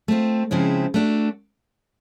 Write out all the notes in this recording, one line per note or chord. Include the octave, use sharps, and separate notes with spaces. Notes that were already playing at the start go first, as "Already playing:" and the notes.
A3 C4 F4
C#3 F3 G#3 C4 E4
A3 D4 F#4